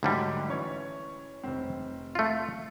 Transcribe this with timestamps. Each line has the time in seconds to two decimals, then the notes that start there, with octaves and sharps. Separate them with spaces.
0.03 D2 G#2 D3 F#3 G3
0.49 E3 C#4 C#5
1.44 F1 C4
2.15 A3 F4